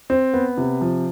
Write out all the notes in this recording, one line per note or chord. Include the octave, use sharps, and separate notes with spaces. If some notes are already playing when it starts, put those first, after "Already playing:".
C4
B3
C3
F3